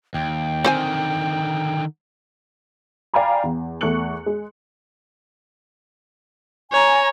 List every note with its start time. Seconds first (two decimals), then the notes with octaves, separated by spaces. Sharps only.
0.14 D#2 G5
0.64 D3 D#3 C4 C5 G#5
3.14 D5 F5 G5 G#5 A#5 B5
3.43 E2
3.81 E2 A3 C#6 F#6 C#7 F#7
4.26 G#3
6.72 C#5 G#5 A#5